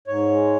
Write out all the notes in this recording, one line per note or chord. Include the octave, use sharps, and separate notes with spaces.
G#2 C#5
G#3